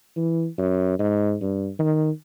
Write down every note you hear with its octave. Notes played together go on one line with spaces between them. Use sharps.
E3
F#2
G#2
G2
D#3